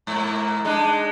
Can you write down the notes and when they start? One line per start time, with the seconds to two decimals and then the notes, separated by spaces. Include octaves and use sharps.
0.07 G#2 A#3
0.65 G#3 D4 D#4